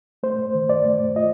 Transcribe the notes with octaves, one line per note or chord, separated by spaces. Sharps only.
A3 C5
D#3
D5
A3
F4 D#5